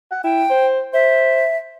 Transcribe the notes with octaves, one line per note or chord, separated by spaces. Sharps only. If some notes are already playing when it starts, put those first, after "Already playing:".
F#5
E4 G5
C5
C5 E5